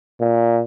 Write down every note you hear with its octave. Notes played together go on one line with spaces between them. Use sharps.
A#2